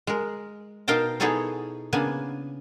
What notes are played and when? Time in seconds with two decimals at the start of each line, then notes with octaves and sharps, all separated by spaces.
0.07 G#3 A#4
0.88 B2 D#4 A#4 F5 G5 A5
1.20 B3 D#4 E4 G#4 A4 C#5
1.93 C#3 A#3 B3 D4 G#5